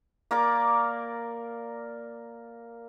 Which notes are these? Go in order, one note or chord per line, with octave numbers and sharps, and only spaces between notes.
A#3 A#4 D5 D6